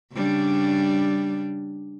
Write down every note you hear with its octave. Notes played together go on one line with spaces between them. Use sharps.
C#3 G3 D4